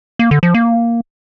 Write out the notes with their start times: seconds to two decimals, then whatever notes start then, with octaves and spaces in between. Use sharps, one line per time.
0.19 A#3
0.31 D3
0.43 F3
0.54 A#3